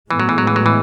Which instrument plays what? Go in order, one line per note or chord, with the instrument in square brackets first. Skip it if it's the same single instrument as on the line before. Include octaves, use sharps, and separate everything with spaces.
[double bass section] A2 G#3 B3 [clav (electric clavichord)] E3
[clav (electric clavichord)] F#3
E3
F#3
E3
F#3
E3